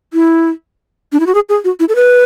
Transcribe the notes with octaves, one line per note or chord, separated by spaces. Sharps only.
E4
D4
E4
F#4
G#4
G#4
F#4
E4
A4
B4